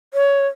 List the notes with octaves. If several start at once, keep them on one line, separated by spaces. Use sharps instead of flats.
C#5